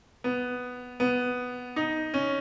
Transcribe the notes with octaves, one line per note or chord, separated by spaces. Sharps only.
B3
B3
D#4
C#4